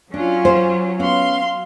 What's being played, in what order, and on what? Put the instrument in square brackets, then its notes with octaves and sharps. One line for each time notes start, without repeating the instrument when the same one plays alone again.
[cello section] F#3 [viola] C#4 F4 [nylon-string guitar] D4
[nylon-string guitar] C5
[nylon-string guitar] B3 C#4 [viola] F5 C6